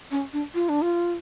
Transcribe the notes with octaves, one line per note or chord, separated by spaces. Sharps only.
C#4
D4
F4
D4
F4